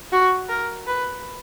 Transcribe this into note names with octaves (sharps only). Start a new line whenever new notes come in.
F#4
A#4
B4